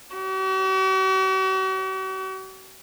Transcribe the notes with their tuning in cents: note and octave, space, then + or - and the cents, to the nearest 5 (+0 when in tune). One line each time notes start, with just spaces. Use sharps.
F#4 +45